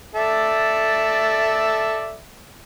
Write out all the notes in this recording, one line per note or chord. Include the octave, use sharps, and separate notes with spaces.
A4 D5 E5